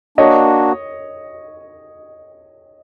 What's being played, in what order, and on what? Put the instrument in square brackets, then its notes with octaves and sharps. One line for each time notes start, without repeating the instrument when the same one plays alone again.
[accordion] A#3 D4 F#4 [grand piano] C#5 D#5